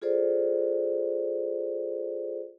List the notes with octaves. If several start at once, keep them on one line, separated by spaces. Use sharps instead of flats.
F4 G#4 A4 C5 D5